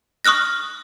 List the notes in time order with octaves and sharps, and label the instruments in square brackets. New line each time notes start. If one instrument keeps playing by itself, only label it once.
[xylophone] C#6 D#6 F6 F#6 A#6